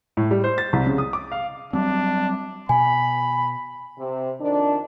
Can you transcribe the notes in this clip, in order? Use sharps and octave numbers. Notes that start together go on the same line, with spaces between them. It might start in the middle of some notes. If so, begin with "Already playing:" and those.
A2
G3
C5
A6
C2
C#3
D#6
D6
F5
F#3 G3 C4 D4
B2 G#5 B5
C3
F2 D#3 D4